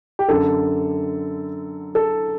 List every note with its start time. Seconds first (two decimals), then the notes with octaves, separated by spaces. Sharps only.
0.19 G4
0.29 F#2 D3 A4
1.95 A4